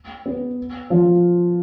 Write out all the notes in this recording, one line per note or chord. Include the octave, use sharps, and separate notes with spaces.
B3
F3